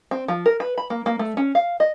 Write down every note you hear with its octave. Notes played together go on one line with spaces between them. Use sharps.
C4
F3
A#4
B4
B5
A#3
A#3
A3
C#4
F5
D#5